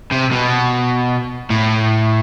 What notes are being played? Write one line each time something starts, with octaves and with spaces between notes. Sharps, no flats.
C3
B2
A2